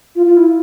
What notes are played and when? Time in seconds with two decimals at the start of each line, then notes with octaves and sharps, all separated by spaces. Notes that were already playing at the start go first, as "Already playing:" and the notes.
0.16 F4
0.26 F4
0.37 E4